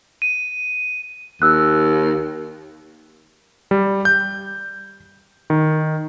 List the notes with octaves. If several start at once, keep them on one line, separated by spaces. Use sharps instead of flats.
D#7
D#2 E6 F#6
G3
G6
D#3